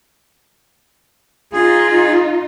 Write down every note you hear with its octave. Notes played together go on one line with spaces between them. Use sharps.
D#4 F4 G#4